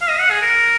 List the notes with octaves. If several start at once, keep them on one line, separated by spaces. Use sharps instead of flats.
F5
D#5
F#5
G#4
A#4